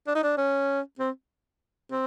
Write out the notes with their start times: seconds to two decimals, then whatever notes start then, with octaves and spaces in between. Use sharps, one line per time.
0.07 D4
0.15 D#4
0.23 D4
0.38 C#4
0.99 C4
1.92 C4